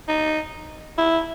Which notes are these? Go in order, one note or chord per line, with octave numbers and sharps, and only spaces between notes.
D#4
E4